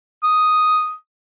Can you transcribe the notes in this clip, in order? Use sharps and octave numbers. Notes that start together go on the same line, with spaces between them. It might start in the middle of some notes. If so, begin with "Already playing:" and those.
D#6